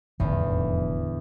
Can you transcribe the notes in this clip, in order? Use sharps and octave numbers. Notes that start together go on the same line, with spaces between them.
F1 E2 A2 D3 D#3